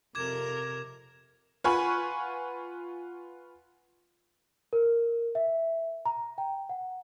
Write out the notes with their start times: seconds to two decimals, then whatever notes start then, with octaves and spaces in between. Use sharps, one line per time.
0.15 F2 C3 A#4 D6 G#6 E7
1.64 F4 B4 F#5 G#5 B5 C#6
4.73 A#4
5.35 E5
6.06 A#5
6.38 G5
6.69 F#5